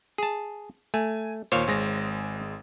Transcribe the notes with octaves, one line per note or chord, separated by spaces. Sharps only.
G#4 A5
A3 G#5
D#2 A#2 C5 C#5 F5
G#1 G#3 A#6